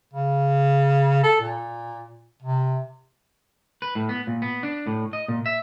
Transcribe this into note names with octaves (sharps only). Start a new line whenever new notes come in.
C#3
A4
A#2
C3
B4
A2
B3
A#2
B3
D4
A2
D#5
A#2
E5